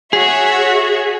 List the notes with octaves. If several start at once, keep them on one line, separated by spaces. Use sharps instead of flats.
F#4 G#4 C#5 E5